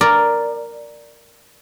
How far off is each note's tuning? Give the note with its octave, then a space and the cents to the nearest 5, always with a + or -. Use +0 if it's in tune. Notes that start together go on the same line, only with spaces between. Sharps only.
A#4 +0 D5 +0